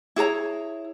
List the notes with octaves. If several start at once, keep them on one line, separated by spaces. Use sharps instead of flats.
E4 G#4 C#5 A#5